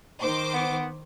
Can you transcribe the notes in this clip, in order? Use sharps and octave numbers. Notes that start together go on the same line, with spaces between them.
D#3 C5 D6
B3